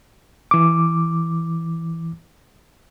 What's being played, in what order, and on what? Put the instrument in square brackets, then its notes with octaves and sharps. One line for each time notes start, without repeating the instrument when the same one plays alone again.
[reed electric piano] E3 D6